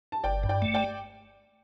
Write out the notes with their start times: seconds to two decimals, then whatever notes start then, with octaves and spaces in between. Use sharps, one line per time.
0.12 A5
0.23 G1 D5 G5
0.43 G2
0.49 D5 G5
0.62 A3
0.74 D5 G5